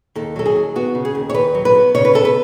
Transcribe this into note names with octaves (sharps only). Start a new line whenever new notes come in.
D#2 A4
F#3 A4
G#4
D#2
B3 F#4
C#3
G#4
D#2
C#5
D#2 B4
F#3
B4
B3
C#3 C#5
B4
B3 A4
B4